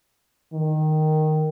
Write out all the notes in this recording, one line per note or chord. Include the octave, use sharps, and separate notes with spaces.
D#3